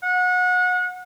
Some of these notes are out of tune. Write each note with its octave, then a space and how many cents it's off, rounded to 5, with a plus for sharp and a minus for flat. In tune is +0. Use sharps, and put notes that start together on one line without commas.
F#5 -30